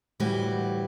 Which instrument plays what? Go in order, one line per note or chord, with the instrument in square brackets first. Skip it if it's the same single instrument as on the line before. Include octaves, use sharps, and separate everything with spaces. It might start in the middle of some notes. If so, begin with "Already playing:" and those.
[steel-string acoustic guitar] D2 A2 E3 G3 F#4 G4